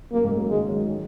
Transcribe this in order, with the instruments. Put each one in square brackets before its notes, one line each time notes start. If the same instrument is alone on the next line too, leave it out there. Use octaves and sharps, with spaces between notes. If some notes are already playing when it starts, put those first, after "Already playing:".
[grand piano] F#2 [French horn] A#3
[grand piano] G#2
G#3
F#3
[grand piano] D#3 [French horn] G#3
[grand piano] F#3
D#3